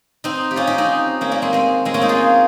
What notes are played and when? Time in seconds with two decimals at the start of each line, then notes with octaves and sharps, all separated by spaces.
0.24 C4 D#4
0.51 G4
0.56 C#4 F4
0.67 D#4 G4
0.78 C4 D#4
1.21 A#3 C#4
1.31 G3 A#3
1.42 G#3 C4
1.53 G#3 C4
1.85 G#3 C4
1.94 A#3 C#4
2.01 C4 D#4
2.09 F4 G#4